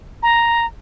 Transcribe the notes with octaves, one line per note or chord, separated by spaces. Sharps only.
A#5